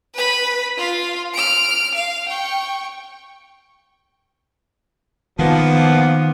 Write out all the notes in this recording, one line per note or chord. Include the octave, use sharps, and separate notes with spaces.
B4 B5
F4 F5
F6 D7
F5
G5 C#6
D#3 F3 A#3 B3